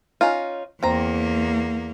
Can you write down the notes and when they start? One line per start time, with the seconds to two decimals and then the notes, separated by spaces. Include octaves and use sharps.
0.21 C#4 D#4 F4
0.83 E2 A#3 C4 A#5